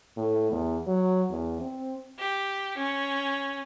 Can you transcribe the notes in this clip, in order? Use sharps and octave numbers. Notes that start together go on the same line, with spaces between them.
A2
E2
F#3
E2
C4
G4
C#4